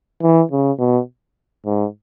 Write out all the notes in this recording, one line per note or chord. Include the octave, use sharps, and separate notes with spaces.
E3
C#3
B2
G#2